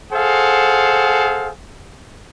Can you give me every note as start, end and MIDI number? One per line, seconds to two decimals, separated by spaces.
0.12 1.50 68
0.12 1.50 69
0.12 1.50 72
0.12 1.50 77
0.12 1.50 78